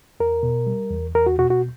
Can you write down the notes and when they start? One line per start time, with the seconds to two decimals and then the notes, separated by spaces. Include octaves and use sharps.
0.20 E2 A#4
0.43 B2
0.67 G3
0.91 E2
1.15 E2 A#4
1.26 F#4
1.39 B2 F#4
1.50 F#4